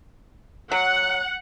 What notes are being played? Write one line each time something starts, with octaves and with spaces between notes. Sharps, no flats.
F#3 F#5